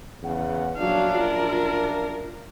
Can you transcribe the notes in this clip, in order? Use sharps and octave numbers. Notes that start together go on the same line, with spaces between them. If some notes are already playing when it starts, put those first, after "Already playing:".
E2 C#3 F#5
A#1 F#2 F#3 D4 F5
F4 A#4